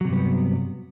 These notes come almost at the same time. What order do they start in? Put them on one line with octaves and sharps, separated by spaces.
F#3 C3 G2 B3